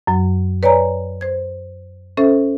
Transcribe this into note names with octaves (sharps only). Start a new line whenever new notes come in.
F#2 F#3
B4 C#5 D5 G#5 A#5
C5 G#6
C#4 A4 C5 E5